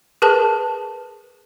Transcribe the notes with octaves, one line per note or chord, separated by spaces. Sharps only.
G#4 A#4 B4 A5